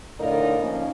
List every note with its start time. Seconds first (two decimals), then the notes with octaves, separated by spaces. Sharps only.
0.19 A2 D3 D#4 F4 A#4 D5
0.61 F3 A#3 C#4 D#4